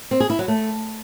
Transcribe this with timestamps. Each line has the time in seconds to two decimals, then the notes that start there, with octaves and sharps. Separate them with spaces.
0.11 C4
0.20 G#4
0.30 E4
0.39 F#3
0.48 A3